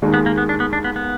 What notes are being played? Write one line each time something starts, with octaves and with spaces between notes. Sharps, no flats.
D#2 D#3 G#3 D#4 G#4
B3
A#3
B3
D4
B3
D4
B3
B3